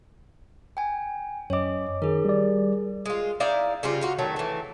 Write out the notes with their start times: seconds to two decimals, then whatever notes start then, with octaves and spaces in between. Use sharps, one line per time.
0.77 G5 G#5
1.50 F#2 C#5 D#5 D6
2.02 D#3 G#4 A#4
2.25 G3 D5
3.06 G#3 F4
3.40 D#4 E4 D5 F5
3.83 C#3 G3 C4 F4
4.01 D#4 F4 F#4
4.18 D#3 F#3 A3
4.36 E3 A3